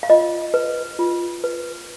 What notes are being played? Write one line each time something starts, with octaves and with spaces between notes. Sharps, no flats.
F5
F4 D#5
B4
F4
B4